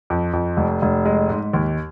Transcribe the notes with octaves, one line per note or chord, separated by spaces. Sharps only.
F2
F2
F1
F1
G#3
G#2
D#2